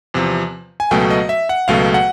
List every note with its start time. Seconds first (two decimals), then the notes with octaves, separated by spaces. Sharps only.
0.14 E2 C3 F3
0.80 G#5
0.91 C#2 B2 F#3 A3 G5
1.10 D#5
1.29 E5
1.49 F#5
1.68 C#2 B2 F#3 A3 F5
1.94 F#5